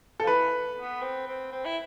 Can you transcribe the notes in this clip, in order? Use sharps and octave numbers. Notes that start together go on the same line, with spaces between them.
F3 A4
E3 B4
B3
C4
C4
C4
E4